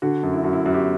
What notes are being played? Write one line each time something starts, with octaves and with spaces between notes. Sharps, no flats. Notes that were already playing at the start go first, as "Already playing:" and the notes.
D3 F#4
F#2
E4
F#2 F#4
E4
F#2 F#4
G4